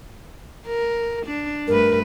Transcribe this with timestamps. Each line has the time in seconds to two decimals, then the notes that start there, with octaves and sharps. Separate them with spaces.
0.67 A#4
1.26 D4
1.68 G2 A3 A#4 B4